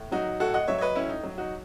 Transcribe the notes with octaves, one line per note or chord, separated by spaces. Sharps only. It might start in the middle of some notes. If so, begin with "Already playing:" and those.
Already playing: A2
F#3 D#4 F#4
A2 F#4 A4
D#5 F#5
F#3 C#5 E5
C#5
B4 D#5
A2 C#4 E4
D#4
F#3
D#4 F#4